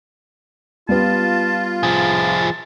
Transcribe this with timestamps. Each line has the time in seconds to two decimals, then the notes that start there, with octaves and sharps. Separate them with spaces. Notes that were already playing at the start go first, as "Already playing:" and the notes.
0.89 G3 B3 F4 A5
1.83 F3 G#4 A5